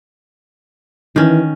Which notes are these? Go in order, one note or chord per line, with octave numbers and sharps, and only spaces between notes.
D#3 E3 C#4